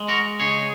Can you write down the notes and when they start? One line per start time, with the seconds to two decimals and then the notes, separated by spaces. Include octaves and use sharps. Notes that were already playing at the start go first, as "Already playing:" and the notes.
Already playing: G#3
0.08 F#4 A#4
0.40 C#3 G#4 C#5